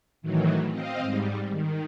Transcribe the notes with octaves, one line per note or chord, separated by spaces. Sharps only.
A2 D#3 E3 F#3
C4 D#5 F5
G#2 G3
D#3